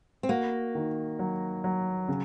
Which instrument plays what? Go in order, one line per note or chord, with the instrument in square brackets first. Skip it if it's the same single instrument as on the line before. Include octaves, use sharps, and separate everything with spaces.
[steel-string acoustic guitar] C4
[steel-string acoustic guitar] A#3 [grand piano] F#4
[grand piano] D#3
F#3
F#3
C#3